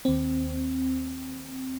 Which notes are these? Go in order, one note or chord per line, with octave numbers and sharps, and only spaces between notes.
D#2 C4